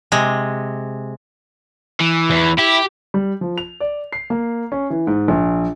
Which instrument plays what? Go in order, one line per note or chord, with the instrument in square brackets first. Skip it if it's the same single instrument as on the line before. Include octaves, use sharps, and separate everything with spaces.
[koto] C3 G#3
[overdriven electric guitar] E3
[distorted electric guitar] E2
[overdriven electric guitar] E4 [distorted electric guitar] G4
[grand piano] G3
F3
F7
D5
C7
A#3
C#4
E3
G#2
A#1